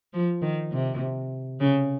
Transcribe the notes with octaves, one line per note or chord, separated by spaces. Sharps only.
F3
D#3
C3
C#3